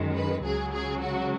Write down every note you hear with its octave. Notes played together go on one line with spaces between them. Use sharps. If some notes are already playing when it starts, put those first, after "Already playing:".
Already playing: F#2 D#3 G#3
B4
C#2 C#3 F#3 G#4
G#4
F#4